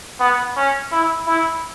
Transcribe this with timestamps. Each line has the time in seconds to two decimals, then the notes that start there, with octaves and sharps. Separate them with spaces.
0.20 B3
0.57 C#4
0.92 E4
1.27 E4